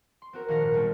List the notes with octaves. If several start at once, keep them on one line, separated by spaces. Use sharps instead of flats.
C6
C4 F#4 A#4
A#1 D#3 F#4 F5 A#6 C#7
G#1 A#2
B1 G3 C4 C#5